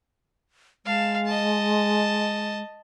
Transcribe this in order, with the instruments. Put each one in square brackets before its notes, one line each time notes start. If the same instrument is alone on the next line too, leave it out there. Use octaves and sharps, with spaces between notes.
[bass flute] G#3 [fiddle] F5 A5
[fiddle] D#5 A5